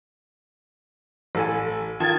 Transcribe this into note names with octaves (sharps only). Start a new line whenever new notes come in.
A1 A4 G#5
D#3 F4 A5 G#6